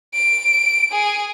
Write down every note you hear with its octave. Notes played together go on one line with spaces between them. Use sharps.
D7
G#4